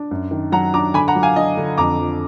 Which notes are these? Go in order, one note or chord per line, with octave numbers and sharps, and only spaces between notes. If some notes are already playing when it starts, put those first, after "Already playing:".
Already playing: D4
F#2
D#3
F#3 F#5 A#5
D4 A#5 D6
D3 G#5 B5
F#5 A#5
F#3
F5 G#5
D4 D#5
D3
F2 A#5 D6
F3